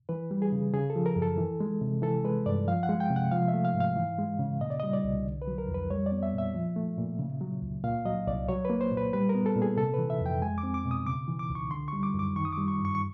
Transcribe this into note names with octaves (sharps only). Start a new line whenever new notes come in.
E3 B4
G3
G#4
C#3
C#3 G#4
A4
F3
A#4
F#2
A4
E3
G#3
C3
E3 A4
G#3 B4
G2 D5
F3 F5
F#5
G#3
G5
C3
F#5
F3 F5
E5
A3
F5
G#2
F5
E3
G#3
C#3
A#2 D#5
D5
G3 D#5
D5
C2
D3
B4
F#3
A#4
F2
B4
G3 C#5
D5
B3
E5
A#2
E5
F3
A3
A#2
C#3
F#3
C#2
A#2 F5
F#3 D#5
C2 D5
F#3 C#5
A#3 B4
C5
A#2
B4
G3 B4
A#4
B3
A4
A#2
G#4
C3 A4
E3 B4
E5
F2 G5
G#3 G#5
D6
C4
D6
B2
D#6
C#3 D6
E3
D6
C#2
C#6
D3 C6
G3 C#6
D6
F#2
D6
D#3 C#6
D#6
D6
G3
C#6
G2
C#6
C#6